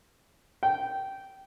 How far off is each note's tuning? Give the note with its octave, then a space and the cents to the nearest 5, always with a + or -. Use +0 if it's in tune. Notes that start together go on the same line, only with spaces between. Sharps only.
G5 -15